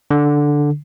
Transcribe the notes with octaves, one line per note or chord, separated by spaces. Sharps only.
D3